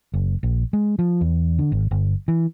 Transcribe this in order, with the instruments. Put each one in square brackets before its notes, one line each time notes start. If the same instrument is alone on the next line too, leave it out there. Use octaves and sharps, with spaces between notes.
[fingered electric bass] F#1
A#1
G#3
F3
E2
D3
G#1
G1
E3